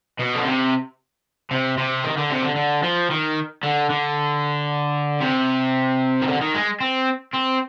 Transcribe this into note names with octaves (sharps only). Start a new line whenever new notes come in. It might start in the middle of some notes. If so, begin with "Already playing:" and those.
B2
D3
C3
C3
C3
D#3
D3
C3
D3
D3
F3
D#3
D3
D3
C3
D#3
D3
D#3
G#3
C4
C4